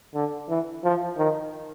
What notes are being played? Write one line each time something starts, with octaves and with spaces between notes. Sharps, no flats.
D3
E3
F3
D#3